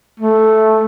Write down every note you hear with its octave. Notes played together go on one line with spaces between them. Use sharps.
A3